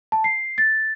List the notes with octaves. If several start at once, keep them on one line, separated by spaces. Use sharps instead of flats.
A5
C7
A6